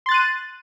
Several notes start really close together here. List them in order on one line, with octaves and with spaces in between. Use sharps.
C6 A6 F#6 D#7